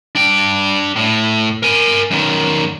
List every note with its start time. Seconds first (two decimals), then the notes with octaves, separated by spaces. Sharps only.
0.15 D4 G5
0.96 A2
1.63 A#4 G#5
2.11 F#2 D#3